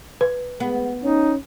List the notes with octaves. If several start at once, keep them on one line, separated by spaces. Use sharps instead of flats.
B4
G#3 B3
C#4 D#4